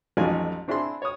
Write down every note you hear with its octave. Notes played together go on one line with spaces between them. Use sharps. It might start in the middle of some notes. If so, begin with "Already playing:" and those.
A1 F2 F#3 D#4 F4 G#5
C4 D4 E4 G#4 B5 C6
C#5 D#6